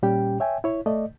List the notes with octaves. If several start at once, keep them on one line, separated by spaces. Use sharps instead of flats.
A#2 G3 C#4 G4 G5
C#5 E5 G5 G#5
E4 C#5
A3 D5 D#5